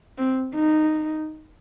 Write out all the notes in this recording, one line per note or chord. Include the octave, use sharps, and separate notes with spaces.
C4
D#4